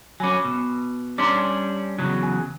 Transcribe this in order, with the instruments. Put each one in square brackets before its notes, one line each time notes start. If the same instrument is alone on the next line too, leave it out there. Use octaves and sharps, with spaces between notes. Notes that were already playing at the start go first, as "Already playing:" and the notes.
[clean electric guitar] F#3 C#4 [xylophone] G#5 B5 D6
[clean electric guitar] B2
[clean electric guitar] G3 C#4 D4 [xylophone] A#5 C6 D6
[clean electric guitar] E2 C#3 F#3
[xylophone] G#5